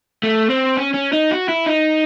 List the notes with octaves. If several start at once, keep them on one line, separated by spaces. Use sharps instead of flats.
A3
C4
C#4
C#4
D#4
F#4
E4
D#4